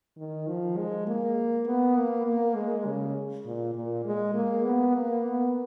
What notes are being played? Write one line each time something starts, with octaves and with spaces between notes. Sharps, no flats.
D#3
F3
G#3
A#3
B3
A#3
A#3
G#3
C#3
A#2
A#2
G#3
A#3
B3
A#3
B3